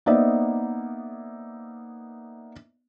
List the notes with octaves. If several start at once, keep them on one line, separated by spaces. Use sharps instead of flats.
A#3 B3 D#4 C5 D5 E5